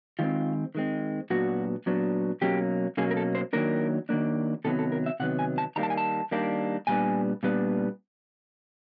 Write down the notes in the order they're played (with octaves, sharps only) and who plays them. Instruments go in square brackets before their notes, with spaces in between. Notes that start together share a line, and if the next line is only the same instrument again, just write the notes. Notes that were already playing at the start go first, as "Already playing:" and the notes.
[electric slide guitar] D#3 G#3 C4 F4
D#3 G#3 C4
A#2 F#3 B3 D4 F#4
A#2 F#3 B3 D4
B2 F#3 A#3 C#4 G4
B2 F#3 A#3 C#4 G#4
A#4
A4
C5
D#3 F#3 A#3 D4 A#4
D#3 F#3 A#3 D4
C3 D#3 F#3 B3 A4
A4
A#4
E5
C3 D#3 F#3 B3 F#5
G#5
A5
D#3 G3 A#3 D4 A#5
A5
G#5
A5
D#3 G3 A#3 D4
A#2 G3 B3 D4 G#5
A#2 G3 B3 D4